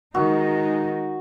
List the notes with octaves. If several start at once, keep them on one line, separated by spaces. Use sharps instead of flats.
D#3 G#3 D#4 F#4